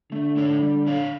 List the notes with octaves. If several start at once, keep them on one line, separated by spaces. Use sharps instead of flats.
D3 A3
E4 A4 C#5
G3
D4 A4 C#5 F5